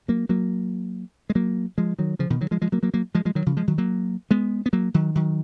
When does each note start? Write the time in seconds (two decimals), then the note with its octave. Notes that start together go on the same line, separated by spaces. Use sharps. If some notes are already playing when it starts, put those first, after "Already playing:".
0.08 F#3 A#3
0.29 F#3 A#3
1.30 G#3
1.35 F#3 A#3
1.78 F3 G#3
1.99 D#3 F#3
2.19 C#3 F3
2.30 B2 D#3
2.41 D#3 F#3
2.51 F3 G#3
2.62 F3 G#3
2.72 F#3 A#3
2.83 F#3 A#3
2.94 F#3 A#3
3.15 F3 G#3
3.25 F3 G#3
3.35 D#3 F#3
3.46 C#3 F3
3.57 F3 G#3
3.68 D#3 F#3
3.78 F#3 A#3
4.31 G#3 B3
4.66 B3
4.73 F#3 A#3
4.94 D#3 F#3
5.16 D#3 F#3